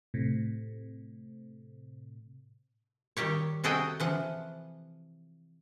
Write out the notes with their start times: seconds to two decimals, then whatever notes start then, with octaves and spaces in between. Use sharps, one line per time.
0.14 A2 C3
3.17 D#3 G3 G4 C#5
3.64 C3 F#4 G#4 A4 D#5 G5
4.00 E3 F3 F#5